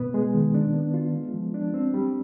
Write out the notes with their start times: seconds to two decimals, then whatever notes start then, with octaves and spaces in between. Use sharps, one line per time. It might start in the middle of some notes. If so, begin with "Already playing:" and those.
Already playing: B2 B3
0.14 G#3
0.34 D#3
0.54 D4
0.74 B3
0.94 F4
1.14 G#3
1.34 F3
1.54 D4
1.74 C4
1.94 G3